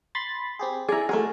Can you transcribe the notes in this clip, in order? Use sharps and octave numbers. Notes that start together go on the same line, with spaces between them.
B5 C6 A6
C4 G4 G#4
E4 G#4 D5 A#5
A3 F#4 G#4 A#4